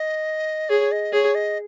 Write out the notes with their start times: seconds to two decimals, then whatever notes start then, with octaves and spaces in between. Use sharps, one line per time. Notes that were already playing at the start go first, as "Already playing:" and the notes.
Already playing: D#5
0.69 G#4 C#5
0.92 D#5
1.13 G#4 C#5
1.35 D#5